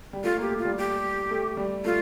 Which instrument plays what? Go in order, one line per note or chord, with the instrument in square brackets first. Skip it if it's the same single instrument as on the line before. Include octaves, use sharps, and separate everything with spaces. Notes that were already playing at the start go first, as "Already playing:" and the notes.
[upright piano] G3
[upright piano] A3 [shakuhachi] F4
[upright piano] A#3 [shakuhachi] G4
[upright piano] A3
[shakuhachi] F4
[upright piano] G3
[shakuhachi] G4
[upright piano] A3
G3
[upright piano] A3 [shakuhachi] F4